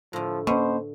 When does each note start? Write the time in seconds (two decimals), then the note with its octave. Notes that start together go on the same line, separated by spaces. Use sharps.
0.13 A2 D3 F3
0.47 B2 A#3 C#4 C5